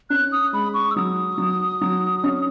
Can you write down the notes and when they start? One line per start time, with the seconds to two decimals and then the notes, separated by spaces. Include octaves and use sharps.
0.10 C#4 F#6
0.32 D#6
0.53 G#3 B5
0.74 C#6
0.91 E6
0.96 F#3 D#6
1.38 F#3
1.81 F#3
2.24 C#4